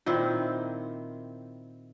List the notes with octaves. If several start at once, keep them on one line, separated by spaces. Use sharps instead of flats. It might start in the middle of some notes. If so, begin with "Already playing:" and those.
A#2 D#3 C4 E4